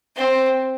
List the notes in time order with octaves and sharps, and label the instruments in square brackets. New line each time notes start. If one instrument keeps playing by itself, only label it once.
[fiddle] C4